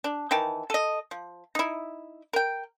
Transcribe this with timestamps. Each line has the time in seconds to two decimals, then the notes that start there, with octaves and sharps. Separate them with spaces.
0.04 D4
0.31 D#3 E3 G5 A5
0.70 A4 D#5
1.11 F3
1.55 D#4 E4
2.33 A#4 G5